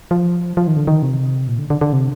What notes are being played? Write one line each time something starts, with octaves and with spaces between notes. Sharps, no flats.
F3
F3
D#3
D3
D#3
C3
A#2
D3
D3
D3
C3